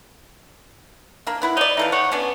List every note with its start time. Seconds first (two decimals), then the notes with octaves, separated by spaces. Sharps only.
1.27 A#3 D4
1.42 B3 E4 F#5
1.57 D#4 C#5 D5
1.77 E3 D#4 A4 F5
1.92 C#5 F#5
2.12 B3 C#4 D4 D5